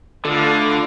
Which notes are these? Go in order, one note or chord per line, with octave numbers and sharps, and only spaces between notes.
D3 A3 F4 A4 B4 D5 D#5 F5